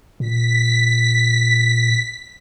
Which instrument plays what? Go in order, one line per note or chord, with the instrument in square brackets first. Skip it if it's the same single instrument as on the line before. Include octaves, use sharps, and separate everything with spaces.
[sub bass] A#2 [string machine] B6